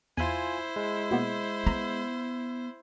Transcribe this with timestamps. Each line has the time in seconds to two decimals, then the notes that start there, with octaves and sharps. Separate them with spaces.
0.17 E2 E4 F4 C5 G#5
0.76 G#3
1.11 B2 A#3 B3
1.67 B3 A#5 B6